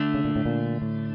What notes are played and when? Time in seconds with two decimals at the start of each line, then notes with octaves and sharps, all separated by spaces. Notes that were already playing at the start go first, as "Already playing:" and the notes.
Already playing: D3 A3 D4
0.14 C#3
0.25 A#2
0.36 A2
0.46 A#2
0.82 A2